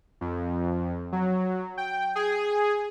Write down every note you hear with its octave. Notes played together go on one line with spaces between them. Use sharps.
F2
F#3
G5
G#4